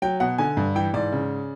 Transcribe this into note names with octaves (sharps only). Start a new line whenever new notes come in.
F#3 G5
B2 F#5
D3 G#5
G2
E3 G5
G#2 D5
C#3